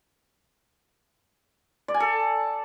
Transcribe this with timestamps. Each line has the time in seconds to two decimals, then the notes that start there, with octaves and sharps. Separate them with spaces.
1.88 D5
1.94 G#5
2.00 A4